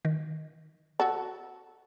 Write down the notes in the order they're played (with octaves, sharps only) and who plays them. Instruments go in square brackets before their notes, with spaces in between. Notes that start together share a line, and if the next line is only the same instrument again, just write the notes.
[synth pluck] D#3
[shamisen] F#4 A4